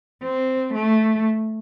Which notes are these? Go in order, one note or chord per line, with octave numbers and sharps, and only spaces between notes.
C4
A3